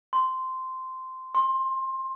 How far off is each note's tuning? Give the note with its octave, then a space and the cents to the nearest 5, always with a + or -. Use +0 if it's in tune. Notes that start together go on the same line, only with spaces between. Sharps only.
C6 -10
C6 +20